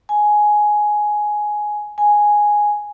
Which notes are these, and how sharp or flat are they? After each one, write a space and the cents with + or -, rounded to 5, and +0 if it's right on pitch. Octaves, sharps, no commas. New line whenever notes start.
G#5 +10
G#5 +0